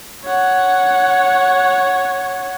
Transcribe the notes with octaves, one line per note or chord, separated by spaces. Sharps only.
C#5 F#5